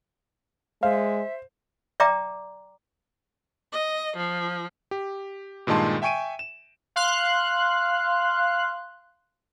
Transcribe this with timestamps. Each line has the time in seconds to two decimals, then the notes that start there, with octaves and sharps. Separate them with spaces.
0.83 G#3 C5 E5 F5
2.00 D5 E5 G5 A#5 D6
3.73 D#5
4.17 F3
4.91 G4
5.67 G2 A#2 D#3 G#3 A5 C6
6.02 E5 G5 G#5 C#6 D7 D#7
6.39 E7
6.96 F5 C6 F#6